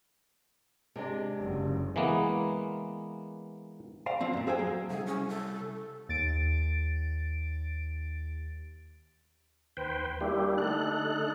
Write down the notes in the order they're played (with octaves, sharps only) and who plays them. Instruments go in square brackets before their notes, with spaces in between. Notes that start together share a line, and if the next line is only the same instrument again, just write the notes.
[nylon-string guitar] C3 G#3 D4
[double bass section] F#1
[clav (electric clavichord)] E3 G#3 A#3 B3
[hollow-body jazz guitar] C5 D5 F5
D3 F3 C4 C5
F#2 A#2
G#4 A4 C5 F5 G5 G#5
F#3
[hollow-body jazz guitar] C2 [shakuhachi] G#4
[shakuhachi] C#4
A4
[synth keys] D#2 A6 D7
[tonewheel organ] D#2 B4 C5 G5
G3 A#3 D4 E4 G4
D3 A3 D#4 A4 F#6